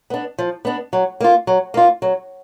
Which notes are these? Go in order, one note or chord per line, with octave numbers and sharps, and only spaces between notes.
B3 D4
F3
B3 D4
F#3
A#3 F4
F#3
A#3 F4
F#3